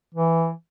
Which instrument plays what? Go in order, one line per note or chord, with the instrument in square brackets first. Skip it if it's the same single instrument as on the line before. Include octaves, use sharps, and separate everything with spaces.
[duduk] E3